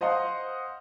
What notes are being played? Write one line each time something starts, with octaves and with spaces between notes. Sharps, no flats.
C5 D#5 F5 F#5 C6